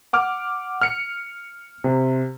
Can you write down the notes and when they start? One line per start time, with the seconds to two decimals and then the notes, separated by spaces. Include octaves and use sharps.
0.13 F#5 D6 F6
0.82 F6 C#7
1.84 C3